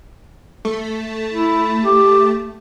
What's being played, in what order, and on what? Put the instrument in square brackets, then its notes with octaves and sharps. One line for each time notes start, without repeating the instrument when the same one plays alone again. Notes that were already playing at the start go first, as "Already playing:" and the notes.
[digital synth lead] A3
[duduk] E4
G4